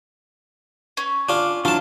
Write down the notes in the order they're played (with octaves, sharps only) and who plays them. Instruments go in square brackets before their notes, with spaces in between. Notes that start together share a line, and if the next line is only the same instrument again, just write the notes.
[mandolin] C#4
[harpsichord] D4 F4 [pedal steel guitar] D6
[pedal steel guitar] E3 F#3 D4 [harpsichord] F4 A5